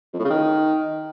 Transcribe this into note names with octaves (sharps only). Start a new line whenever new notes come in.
F2
A2
C#3
D#3